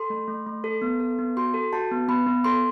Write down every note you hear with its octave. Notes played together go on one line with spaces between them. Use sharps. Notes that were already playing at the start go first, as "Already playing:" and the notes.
Already playing: A4 C6
A3
A3
A3
A4
B3
A4
B3
F#4 C6
A4
F#4 A5
B3
B3 B5
B3
A4 C6